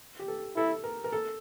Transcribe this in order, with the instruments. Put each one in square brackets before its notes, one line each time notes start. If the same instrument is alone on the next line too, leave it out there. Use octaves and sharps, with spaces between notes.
[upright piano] G4
A4
[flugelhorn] E4 [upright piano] A4
[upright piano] A#4
A#4
A4